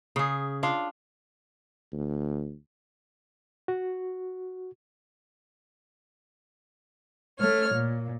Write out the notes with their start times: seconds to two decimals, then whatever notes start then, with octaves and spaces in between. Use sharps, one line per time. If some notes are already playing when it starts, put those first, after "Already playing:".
0.16 C#3 G#4
0.63 D4 F4 F5
1.92 D2
3.68 F#4
7.40 A3 C#5 F6
7.73 A#2